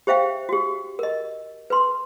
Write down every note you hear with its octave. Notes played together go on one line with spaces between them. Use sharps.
G4 C5 E5 F5 G5
F#4 G4
A#4 D#5
B4 C6